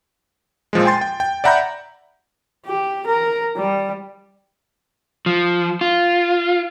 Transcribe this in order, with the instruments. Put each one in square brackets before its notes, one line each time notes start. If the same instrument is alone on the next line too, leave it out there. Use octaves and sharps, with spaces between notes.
[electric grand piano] A#2 F3 G#3
G5 G#5 C6 A6
G5
G5
D5 E5 F#5 A#5 B5 G6
[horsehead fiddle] G4
A#4
G3
[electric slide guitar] F3
F4